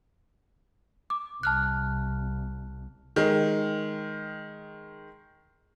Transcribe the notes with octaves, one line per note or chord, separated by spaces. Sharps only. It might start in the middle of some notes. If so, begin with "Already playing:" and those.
D6
C2 A5 F6 F#6
D#3 G#3